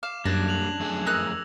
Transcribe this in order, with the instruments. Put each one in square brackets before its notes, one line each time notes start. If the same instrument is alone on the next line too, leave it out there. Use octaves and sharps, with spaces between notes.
[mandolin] F5 [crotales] D6 E7
[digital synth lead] F#2 [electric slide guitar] G3 A#3 [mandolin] D4 [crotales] F#6 G#6 A#6
[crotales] F#6 F7 F#7
[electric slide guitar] F2 A3 G#4
[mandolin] D#4 A#4 F#6 [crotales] E6 A#6